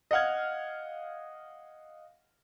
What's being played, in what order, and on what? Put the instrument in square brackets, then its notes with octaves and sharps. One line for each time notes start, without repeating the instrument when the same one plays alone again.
[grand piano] D#5 F5 F#5 F6 G#6